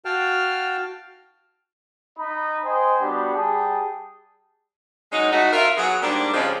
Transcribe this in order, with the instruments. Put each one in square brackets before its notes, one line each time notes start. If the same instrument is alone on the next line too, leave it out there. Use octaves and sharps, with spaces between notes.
[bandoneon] F#4 F5 G5 A5 F6
[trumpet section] D#4 D#5 B5
C5 D#5 G5 G#5 C6
G3 B3 D4 F#4 G4
G3 G#4 G5 A5
[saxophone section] F#3 G#3 C#4 D#4
A3 D#4 F#4
F4 A#4 E5
F#3 B3 G#4
G#2 G3 A#3 D4
C#3 F3 G3 G#3 C4 C#4